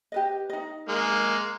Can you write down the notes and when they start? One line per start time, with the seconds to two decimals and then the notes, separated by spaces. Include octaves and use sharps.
0.12 G4 B4 D#5
0.50 D#4 D#5
0.89 G#3 A#3